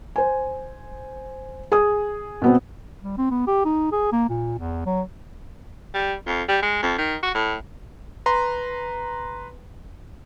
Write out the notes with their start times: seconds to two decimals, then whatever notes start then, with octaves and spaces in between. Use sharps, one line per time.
0.16 C5 G#5
1.72 G#4 G#5 D#6
2.42 B2 B3 C4
3.03 G3
3.18 C4
3.31 B3
3.47 G4
3.65 D#4
3.92 G#4
4.13 A#3
4.29 A#2
4.59 E2
4.86 F#3
5.94 G3
6.26 F2
6.49 G3
6.62 G#3
6.82 F2
6.98 D#3
7.23 F#4
7.34 A2
8.26 B4 A#5 C6